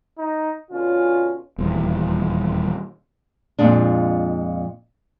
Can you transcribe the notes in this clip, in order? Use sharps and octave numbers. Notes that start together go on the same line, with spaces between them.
D#4
B2 D3 C#4 F4
D#1 E2
F2 A#2 G#3 D4